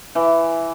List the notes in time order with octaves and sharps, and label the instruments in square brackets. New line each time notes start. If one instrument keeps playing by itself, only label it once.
[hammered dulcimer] E3